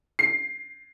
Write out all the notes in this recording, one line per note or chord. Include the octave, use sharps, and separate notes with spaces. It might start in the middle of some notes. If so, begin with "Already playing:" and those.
C7